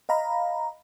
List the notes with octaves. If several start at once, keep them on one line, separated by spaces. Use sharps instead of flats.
D#5 F5 A#5 B5